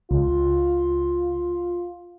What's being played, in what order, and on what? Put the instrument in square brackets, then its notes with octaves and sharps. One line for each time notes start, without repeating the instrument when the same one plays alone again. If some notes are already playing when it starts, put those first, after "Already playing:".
[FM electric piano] C#2 [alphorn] F4